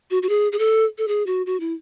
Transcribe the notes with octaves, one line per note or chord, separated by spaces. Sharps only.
F#4
F#4
G#4
G#4
A4
A4
G#4
F#4
F#4
E4